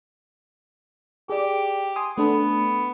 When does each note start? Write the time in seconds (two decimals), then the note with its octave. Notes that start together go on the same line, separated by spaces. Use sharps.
1.30 G4 G#4 D5
1.96 G#5 C6 D#6
2.18 A3 B3 D4 A4